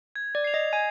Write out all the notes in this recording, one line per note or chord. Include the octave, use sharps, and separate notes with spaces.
G#6
D5
C7 F7
D#5
G#5 G#6